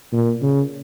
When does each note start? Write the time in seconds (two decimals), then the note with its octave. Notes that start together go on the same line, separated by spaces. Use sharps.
0.13 A#2
0.42 C#3